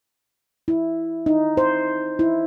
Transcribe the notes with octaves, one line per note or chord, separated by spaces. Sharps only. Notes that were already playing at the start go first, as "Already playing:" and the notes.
E4
D#4
C5
E4